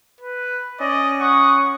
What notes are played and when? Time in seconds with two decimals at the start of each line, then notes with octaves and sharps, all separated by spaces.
0.21 B4
0.80 C#4 D5 D#5
1.20 F#5 C#6 D#6